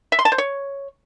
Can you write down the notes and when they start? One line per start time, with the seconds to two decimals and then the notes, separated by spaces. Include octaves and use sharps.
0.12 E5
0.19 C6
0.25 A5
0.32 C5
0.38 C#5